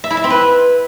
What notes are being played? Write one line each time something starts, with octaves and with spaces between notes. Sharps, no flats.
E5
E4
E5
C4
B4